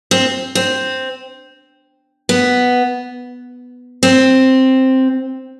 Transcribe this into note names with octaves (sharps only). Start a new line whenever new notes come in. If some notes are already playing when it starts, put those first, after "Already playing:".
C4
C4
B3
C4